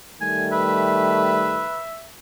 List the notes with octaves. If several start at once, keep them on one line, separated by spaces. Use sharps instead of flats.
D#3 G3 A3 G#5
B4 E5